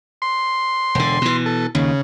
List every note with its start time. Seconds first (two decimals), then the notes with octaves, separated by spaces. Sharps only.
0.22 C6
0.95 E1 D3
1.22 B2 E3
1.46 A4
1.75 D#2 C#3